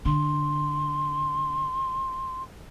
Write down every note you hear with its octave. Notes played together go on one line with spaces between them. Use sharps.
D3 C6